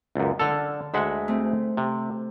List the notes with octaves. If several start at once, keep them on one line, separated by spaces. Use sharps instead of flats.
C#2 F#2
D3 A4 F6
D2 G#3 E5 F#5
A3 C4
C3